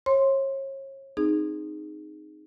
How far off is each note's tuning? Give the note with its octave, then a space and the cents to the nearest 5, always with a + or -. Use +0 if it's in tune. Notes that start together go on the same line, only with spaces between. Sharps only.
C#5 -35 C6 +0
C4 +0 D#4 -10 G#4 +0